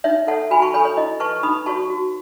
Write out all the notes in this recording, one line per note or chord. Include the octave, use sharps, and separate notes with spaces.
D#4 C#5 E5
A4 C#5 F#5 A5
F#4 G#5 B5
A5 C#6
A4 C#5 G#5 B5
C#5
E4 D#5
B4 A5 C#6
D#4 B5 D#6
F#4 C#5 A5 C#6
F#4